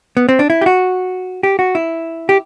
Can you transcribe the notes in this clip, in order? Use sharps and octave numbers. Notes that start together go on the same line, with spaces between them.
B3
C4
D4
E4
G4
F#4
G4
F#4
E4
G4